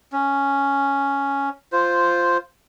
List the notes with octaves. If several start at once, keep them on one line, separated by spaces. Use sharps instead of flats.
C#4
F4 C5